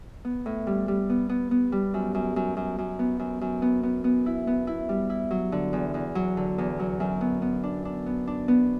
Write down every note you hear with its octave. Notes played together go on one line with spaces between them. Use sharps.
B3
A2
G3
G3
B3
B3
B3
G3
F#2
F#2
F#2
F#2
F#2
B3
F#2
F#2
B3
B3
B3
E4
B3
E4
G3
E4
F#3
D3
E2
E2
F#3
D3
E2
F#3
F#2
B3
B3
D4
D4
B3
D4
B3